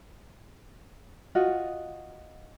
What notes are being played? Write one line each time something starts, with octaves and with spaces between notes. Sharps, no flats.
F4 F#4 D#5